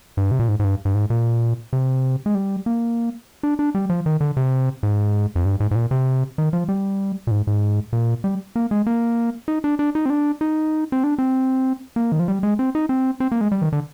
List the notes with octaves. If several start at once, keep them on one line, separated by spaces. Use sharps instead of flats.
G2
C3
A#2
G#2
G#2
G2
G2
G#2
A#2
C3
G#3
G3
A#3
D4
D4
G3
F3
D#3
D3
C3
G#2
F2
G2
G#2
G#2
A#2
C3
D#3
F3
G3
A#2
G#2
G#2
A#2
G3
A#3
G#3
A#3
D#4
D4
D4
D#4
C4
D4
D#4
C4
D4
C4
A#3
D#3
F3
G3
G#3
C4
D#4
C4
C4
A#3
G#3
G3
D#3
D3